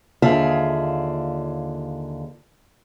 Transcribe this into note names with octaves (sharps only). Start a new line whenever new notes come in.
D#2 D3 F4 G#4 E5